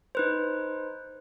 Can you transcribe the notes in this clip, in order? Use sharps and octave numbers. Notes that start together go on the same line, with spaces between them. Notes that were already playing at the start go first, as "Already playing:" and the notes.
D#4 B4 C5